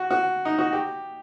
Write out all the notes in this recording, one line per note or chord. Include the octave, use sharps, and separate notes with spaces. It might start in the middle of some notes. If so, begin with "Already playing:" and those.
Already playing: F#4
F#4
D#4
F#4
G4